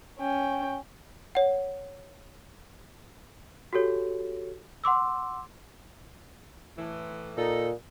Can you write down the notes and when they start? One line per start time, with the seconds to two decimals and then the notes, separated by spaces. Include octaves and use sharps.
0.19 C#4 G5
1.35 C#5 F#5
3.73 F#4 G4 A4 C#5
4.84 F#5 C6 D6 E6
6.78 A2 E3
7.37 A#2 D#4 A4